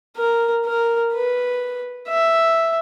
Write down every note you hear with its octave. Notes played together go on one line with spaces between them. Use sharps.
A#4
A#4
B4
E5